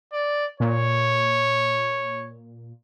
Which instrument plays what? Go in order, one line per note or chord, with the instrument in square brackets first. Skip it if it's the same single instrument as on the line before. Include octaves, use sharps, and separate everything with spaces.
[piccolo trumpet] D5
[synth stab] A#2 [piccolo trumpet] C#5